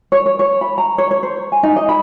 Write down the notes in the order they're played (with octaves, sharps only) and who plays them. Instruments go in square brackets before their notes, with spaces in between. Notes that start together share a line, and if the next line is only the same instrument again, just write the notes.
[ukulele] C#5
C#5
C#5
B5
A#5
C#5
C#5
C5
G#5
D#4
D#5
B5